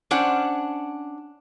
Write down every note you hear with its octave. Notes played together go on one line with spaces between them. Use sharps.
C#4 D4 C5 F#5